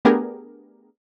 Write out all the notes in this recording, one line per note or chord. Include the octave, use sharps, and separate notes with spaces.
A3 B3 D4 G4 G#4 A#4